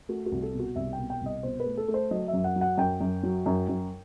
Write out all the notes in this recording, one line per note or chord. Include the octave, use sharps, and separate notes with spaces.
A3 F#4
F#4
C2
A4
B2
F#4
C2 E5
G5
B2
G5
C2 D#5
B2 C5
B4
A3
A4
A3
C5
F#3 D#5
E5
F#2
F#5
F#3
F#5
F#2 G5
F#2
F#3
F#2
F#2